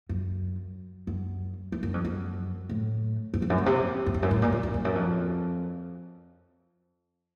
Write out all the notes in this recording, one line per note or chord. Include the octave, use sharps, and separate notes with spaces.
F#2
F#2
F#2
F#2
F2
F#2
A2
F#2
F2
F#2
A#2
C3
F#2
F2
F#2
A2
A#2
A#2
F#2
F2
F#2
F2